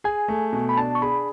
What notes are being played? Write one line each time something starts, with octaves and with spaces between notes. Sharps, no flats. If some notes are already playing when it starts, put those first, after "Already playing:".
G#4 G#5
A3
B2
B5
D4 A5
C#6
G#4 B5